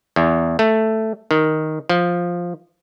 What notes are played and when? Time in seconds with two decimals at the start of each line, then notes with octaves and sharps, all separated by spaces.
0.16 E2
0.59 A3
1.31 D#3
1.89 F3